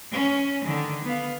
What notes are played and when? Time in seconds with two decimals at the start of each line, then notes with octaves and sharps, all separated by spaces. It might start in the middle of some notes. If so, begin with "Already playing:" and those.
0.12 C#4
0.64 D3 D#3
1.04 B3 F5